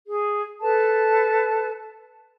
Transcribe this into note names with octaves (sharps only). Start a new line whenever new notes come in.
G#4
A4 B4 A5